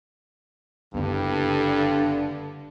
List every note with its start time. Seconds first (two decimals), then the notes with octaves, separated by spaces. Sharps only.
0.94 F#1 G2 D3 B3